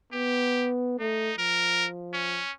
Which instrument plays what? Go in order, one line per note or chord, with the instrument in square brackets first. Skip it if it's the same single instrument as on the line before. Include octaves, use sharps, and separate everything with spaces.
[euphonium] B3 [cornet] G4
[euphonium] A3 [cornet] D#4
[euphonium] F3 [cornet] A#4
[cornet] C#4